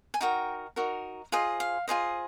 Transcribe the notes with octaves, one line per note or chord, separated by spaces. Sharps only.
G#5
D#4 F#4 A#4 G5
D#4 F#4 A#4
F4 G#4 C5 D#5
F5
F4 G#4 C5 D#5